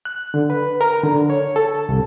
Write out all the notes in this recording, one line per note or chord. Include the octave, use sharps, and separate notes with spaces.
F#6
D3
B4
A#4
D3
C#5
A4
C2